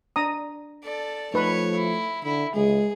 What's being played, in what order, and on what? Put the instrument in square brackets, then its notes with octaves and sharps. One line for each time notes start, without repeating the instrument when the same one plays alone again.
[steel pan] D4 A#5 D#6
[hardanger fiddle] A4 D5
[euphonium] F3 [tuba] A3 [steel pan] D#4 B4 [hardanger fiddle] C#5
[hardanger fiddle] E4
[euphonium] D3 [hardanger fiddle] E4
[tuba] C#2 [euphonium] G#3 [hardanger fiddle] G#4